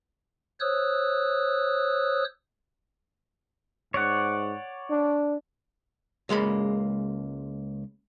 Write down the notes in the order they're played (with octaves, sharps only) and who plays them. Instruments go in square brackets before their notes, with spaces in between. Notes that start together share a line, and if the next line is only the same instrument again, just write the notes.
[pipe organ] C5 C#5 D#6 E6 F#6
[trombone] G#2 [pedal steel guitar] C#5 D5 F#5
[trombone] D4
[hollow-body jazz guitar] C#2 G#3 A#3 B5